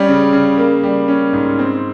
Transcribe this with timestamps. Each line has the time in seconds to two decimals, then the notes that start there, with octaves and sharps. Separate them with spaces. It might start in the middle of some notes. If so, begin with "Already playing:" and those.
Already playing: G3 C#4
0.08 C#3
0.33 C#3
0.58 A#3
0.83 G3
1.08 C#4
1.33 G#2
1.59 C4